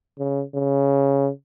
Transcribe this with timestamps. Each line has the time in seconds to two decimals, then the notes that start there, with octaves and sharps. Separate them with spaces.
0.19 C#3
0.55 C#3